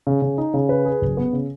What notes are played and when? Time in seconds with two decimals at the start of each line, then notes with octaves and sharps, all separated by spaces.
0.07 C#3
0.22 C#3
0.38 D#4
0.54 C#3
0.69 B4
0.85 G#4
1.01 F#1
1.17 B3
1.33 C#3